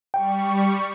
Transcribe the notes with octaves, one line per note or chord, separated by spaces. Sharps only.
G3 G5 C#6